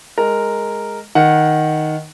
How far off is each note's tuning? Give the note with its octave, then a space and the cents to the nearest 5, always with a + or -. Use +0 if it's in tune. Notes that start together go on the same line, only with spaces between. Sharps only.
G#3 +0 A#4 -5
D#3 +0 F#5 +0